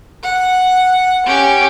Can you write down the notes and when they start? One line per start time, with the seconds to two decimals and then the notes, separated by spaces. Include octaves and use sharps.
0.23 F#5
1.27 C#4 G4